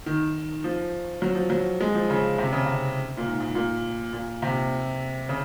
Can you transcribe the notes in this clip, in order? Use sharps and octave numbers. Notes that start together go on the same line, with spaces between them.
D#3
F3
F#3
F3
F#3
G#3
F3
C#3
C3
C#3
C3
A#2
G#2
G#2
A#2
A#2
C3
C#3